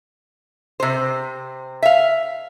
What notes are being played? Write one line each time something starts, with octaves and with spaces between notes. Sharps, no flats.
C3 C5
E5 F5